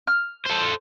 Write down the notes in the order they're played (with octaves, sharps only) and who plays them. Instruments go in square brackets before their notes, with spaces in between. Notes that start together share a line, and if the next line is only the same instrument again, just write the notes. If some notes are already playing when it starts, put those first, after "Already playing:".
[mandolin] F6
[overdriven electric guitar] A4 C5